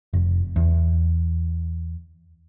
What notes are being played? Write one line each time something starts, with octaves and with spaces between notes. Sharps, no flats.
F1
E2